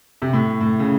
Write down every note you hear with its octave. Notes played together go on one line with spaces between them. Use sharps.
C3
A2
A2
C#3